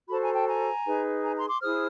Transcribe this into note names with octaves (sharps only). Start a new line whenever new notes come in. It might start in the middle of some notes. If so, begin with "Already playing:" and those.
F#4 A4 C5 A5 B5
G#5 A#5
G5 A5
G#5 A#5
D#4 G#4 B4
G#5 A#5
A#5 C6
C6 D6
E4 G#4 C5 D#6 F6